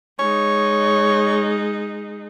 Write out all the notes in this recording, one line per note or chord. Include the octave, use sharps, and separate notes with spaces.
G#3 D#4 C#5